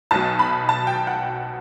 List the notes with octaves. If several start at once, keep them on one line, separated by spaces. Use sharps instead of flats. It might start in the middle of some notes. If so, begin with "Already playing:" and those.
B1 B2 F#3 A5
B5
A5
G5
F#5